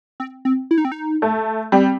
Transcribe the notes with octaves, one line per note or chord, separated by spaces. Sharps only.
C4
C4
E4
D#4
C4
D#4
A3
G3 C4